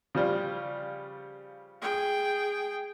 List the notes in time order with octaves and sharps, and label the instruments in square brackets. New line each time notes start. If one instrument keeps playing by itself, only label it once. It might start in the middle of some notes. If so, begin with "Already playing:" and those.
[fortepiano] C#3 F3 G3
[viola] G#4 G5